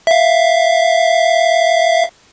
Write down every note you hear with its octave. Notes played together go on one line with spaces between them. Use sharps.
E5 F5